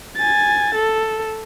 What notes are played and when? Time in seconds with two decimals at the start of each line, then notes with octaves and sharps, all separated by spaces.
0.16 G#5 A6
0.75 A4